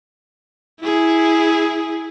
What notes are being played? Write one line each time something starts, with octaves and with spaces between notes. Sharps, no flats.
E4 G#4